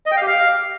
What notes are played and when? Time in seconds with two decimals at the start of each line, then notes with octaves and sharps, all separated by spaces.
0.06 D#5
0.11 G5
0.16 F5
0.22 G4
0.27 F5